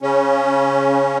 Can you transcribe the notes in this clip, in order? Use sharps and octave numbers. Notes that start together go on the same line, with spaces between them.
C#3 C#4